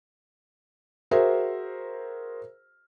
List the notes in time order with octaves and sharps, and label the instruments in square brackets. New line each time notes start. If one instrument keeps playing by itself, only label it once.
[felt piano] F#4 G#4 A#4 C5 E5